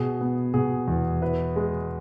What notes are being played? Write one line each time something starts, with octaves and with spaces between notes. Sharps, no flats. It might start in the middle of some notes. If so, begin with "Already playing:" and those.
Already playing: B2 G#4
B3
B2 G#4
E2
E4 B4
G#3